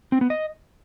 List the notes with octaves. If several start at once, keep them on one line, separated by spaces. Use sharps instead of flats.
C4
B3
D#5